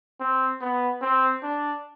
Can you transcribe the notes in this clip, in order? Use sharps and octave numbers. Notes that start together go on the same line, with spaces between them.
C4
B3
C4
D4